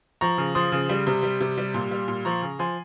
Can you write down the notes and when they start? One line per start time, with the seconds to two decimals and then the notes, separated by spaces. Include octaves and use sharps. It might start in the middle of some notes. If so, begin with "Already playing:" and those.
0.21 F3 A#5 C#6
0.38 C#3
0.55 F3 C6 D#6
0.72 C#3
0.89 G3
1.07 C3
1.23 G3
1.40 C3
1.58 G3
1.74 A#2
1.91 G3
2.08 A#2
2.25 F3 A#5 C#6
2.42 C#3
2.59 F3 G#5 C6